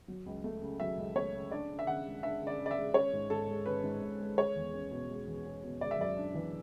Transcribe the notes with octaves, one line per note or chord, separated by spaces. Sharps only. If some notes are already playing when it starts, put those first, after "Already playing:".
F#3
C#2
A3
C#3
F#3 E5
C#2
A3 C#5
C#3
D4 D5
C#3
E5
C#3 F#5
G#3
D4 E5
C#3
D5
C#3
D5
E5
G#3
C#4 C#5
G#2
G#2 A4
G#3
C#4 B4
G#2
G#2
G#3
G#3 C#5
E2
C#4
B2
G#3
E2
C#4
B2
G#3 D5
E5
F#2 D5
D4
E3